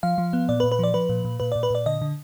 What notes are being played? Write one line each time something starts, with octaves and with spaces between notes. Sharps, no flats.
F3 F5
F3
B3
A#2 D5
B4
A#2
B4
F3 D5
F3 B4
A#2
A#2
A#2 B4
A#2 D5
B4
A#2 D5
D3 D#5
D3